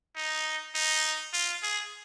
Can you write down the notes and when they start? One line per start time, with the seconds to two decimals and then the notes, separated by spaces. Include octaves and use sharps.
0.16 D#4
0.75 D#4
1.33 F4
1.63 G#4